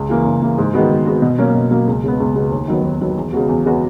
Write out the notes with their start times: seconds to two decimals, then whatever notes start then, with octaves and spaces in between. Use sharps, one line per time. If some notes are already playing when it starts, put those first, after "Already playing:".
Already playing: C#2
0.09 C#3 E3 A#3
0.26 C#2
0.42 C#3 E3 A#3
0.58 G#2
0.74 D#3 G#3 B3 F#4
0.90 G#2
1.06 D#3 G#3 B3 F#4
1.22 B2
1.38 F#3 A#3 C#4
1.54 B2
1.71 F#3 A#3 C#4
1.87 C#2
2.04 C#3 G#3 B3
2.20 C#2
2.35 C#3 G#3 B3
2.52 D#2
2.68 D#3 F#3 B3
2.84 D#2
3.01 D#3 F#3 B3
3.17 E2
3.33 C#3 G#3 B3 F#4
3.49 E2
3.66 C#3 G#3 B3 F#4